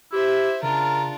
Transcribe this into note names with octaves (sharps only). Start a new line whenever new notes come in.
E4 G4 C5 E5
C#3 D4 F4 A#4